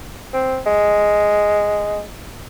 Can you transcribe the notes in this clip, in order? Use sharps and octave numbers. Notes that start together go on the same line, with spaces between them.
C4
G#3